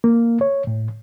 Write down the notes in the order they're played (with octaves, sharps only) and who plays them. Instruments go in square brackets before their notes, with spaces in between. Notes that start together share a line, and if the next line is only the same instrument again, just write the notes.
[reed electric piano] A#3
C#5
A2